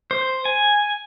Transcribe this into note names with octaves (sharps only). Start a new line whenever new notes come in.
C5
G#5